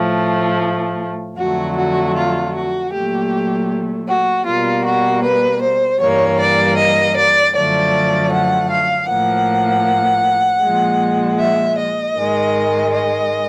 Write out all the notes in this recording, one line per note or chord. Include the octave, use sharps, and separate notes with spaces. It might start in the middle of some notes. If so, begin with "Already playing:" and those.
Already playing: A2 F3 A3
F2 D3 F#3 A3 F#4
F#4
F4
F#4
A#2 F#3 A3 G4
F#4
B2 G3 A#3 F4
F#4
B4
C5
G2 E3 G3 A#3 C#5
D5
D#5
D5
F#2 D3 F3 A3 D5
F#5
F5
A2 F3 A#3 F#5
A#2 F3 G#3
E5
D#5
G#2 D#3 G#3
D#5